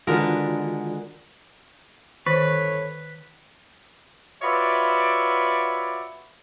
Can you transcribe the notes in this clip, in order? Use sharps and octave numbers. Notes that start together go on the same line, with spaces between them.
D3 D#3 G#3 B3 F4 F#4 A#4
G1 D#3 A4 B4 C#5
F4 F#4 B4 C#5 D5 E5